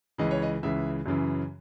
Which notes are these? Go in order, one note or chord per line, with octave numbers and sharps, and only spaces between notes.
C#2 C#3 E3 D#5
C#5
D#5
C#2 C#3 E3 E5
F#2 C#3 E3